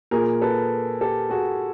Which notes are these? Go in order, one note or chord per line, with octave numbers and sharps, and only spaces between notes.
A#2 G#4 A#4
A4 B4
G4 A4
F#4 G#4